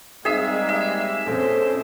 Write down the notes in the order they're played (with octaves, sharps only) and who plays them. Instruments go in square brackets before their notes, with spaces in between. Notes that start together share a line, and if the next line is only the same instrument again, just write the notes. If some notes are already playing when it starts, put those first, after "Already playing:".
[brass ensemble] G3 G#3 A#3 [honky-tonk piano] C4 D#4 F5 [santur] G#4 E5
[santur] E5
[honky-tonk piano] A#1 F2 [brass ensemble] C#4 C5 [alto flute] A4